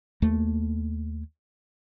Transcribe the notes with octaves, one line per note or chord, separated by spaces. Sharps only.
D#2 A3 A#3